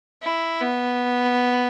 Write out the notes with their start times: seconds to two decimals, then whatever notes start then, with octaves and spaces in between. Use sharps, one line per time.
0.23 E4
0.60 B3